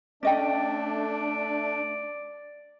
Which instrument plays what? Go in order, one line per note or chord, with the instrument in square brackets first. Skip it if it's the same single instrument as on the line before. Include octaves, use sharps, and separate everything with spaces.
[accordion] A3 D4 [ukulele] C#4 D#5 G5 [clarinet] D5